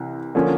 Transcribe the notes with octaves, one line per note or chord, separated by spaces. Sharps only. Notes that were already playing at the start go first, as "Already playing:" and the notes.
Already playing: C2 C3 E3
D3 F3 A#3 C#4